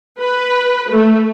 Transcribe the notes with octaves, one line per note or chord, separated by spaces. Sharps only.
B4
A3